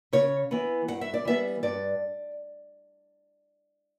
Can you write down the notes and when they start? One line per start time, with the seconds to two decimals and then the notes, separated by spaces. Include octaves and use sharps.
0.13 C#3 C#5
0.51 E3 B3
0.88 G2 F#5
1.01 E5
1.14 D5
1.25 E3 G3 B3 E5
1.63 G2 D5